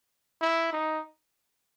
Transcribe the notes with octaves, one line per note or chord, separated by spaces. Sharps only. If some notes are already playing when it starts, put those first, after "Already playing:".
E4
D#4